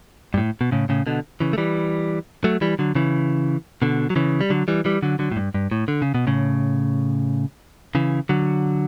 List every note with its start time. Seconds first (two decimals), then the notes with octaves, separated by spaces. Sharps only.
0.34 G2
0.38 A2
0.61 B2
0.72 A2 C#3
0.89 A2 C#3
1.06 B2 D3
1.40 C#3 E3
1.53 A3
1.58 E3 G3
2.44 F#3 A3
2.61 E3 G3
2.79 D3 F#3
2.95 C#3 E3
3.82 B2 D3
4.10 F#3
4.16 C#3 E3
4.41 G3
4.50 D3 F#3
4.68 E3 G3
4.85 E3 G3
5.03 D3 F#3
5.19 D3 F#3
5.32 A2
5.36 G2
5.55 G2
5.71 A2
5.88 D3
6.02 C#3
6.15 B2
6.27 A2 C#3
7.95 C#3 E3
8.29 D3 F#3